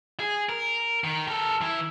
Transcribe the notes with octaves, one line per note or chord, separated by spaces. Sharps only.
G#4
A#4
D#3
A4 A#4
E3 E4